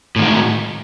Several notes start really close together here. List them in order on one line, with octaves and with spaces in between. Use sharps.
A2 D#3 G#3